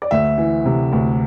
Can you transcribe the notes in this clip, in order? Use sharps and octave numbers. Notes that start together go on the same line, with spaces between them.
D5
D2 E5
E3
C3
D2